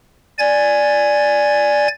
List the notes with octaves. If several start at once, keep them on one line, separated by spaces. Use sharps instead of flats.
D5 G#5 G#6 A6